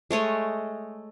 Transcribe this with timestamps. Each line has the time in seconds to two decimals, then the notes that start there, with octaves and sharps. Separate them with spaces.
0.11 G#3 A3 C#5 D#5